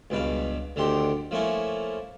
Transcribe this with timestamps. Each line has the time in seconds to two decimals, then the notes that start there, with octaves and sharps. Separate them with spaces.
0.10 C#2 G2 B2 B4 F5
0.76 D2 D3 D#3 G4 C6
1.31 F3 A3 A#3 C#4 E4